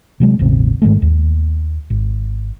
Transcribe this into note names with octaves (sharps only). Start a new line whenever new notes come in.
C3 F#3 G#3
E1 A1 C#3 C4
G#2 D#3 G#3 A3
D#2
G#1